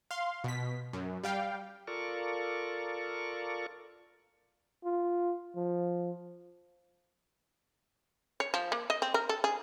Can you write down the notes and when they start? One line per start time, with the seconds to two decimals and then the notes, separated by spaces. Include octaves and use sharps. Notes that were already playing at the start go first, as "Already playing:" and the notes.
0.11 F5 C6
0.44 B2 B6
0.93 F#2
1.23 G3 F5 G5
1.87 F4 A4 A#4 D5 C#6
4.84 F4
5.56 F3
8.40 C#5
8.54 F3
8.72 A#3
8.90 D#5
9.02 C4
9.14 A#4
9.29 A4
9.44 G#4